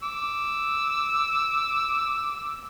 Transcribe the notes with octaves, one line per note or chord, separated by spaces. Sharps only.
D6 E6